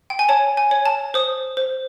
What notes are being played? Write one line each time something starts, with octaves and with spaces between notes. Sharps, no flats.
G5
G#5
C#5 A5
G#5
C#5
A5
C5 D#6
C5